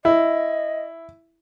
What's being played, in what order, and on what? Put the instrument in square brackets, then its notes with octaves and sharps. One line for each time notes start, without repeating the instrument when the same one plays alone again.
[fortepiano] E4 [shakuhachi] D#5